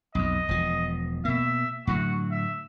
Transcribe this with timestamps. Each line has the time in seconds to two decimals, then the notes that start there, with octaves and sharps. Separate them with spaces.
0.15 B1 F2 D#5
0.49 E1 F3
1.25 B2 A#3 E5
1.87 A2 D3 F#3 F#4
2.31 E5